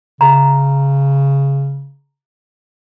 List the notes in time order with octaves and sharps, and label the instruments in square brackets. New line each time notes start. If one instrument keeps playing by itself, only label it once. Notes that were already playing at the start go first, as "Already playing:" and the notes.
[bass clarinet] C#3 [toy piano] A#5